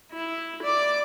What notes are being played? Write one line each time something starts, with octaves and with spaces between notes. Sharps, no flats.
E4
D5 D6